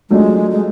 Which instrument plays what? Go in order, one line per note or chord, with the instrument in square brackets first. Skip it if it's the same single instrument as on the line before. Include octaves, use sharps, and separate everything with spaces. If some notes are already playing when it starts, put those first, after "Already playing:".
[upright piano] F#3 A3 D4 F4 [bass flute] G#3
[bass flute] G#3